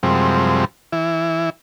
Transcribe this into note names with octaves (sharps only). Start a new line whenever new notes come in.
F#2 C3 F3 G3 G#3 C4
E3 E4